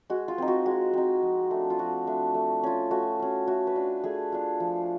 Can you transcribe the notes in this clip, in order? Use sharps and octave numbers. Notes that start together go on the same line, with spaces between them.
G#3 F#4
F4
C4 D#4
F#4
G#3 F#4
C4 D#4
F3
A3 D4
F4
F3 F#4
A3 D4
A3
C#4 F4
A3 F#4
C#4 F4
A3 F#4
B4
D4 F4
A3 G#4
D4 F4
F3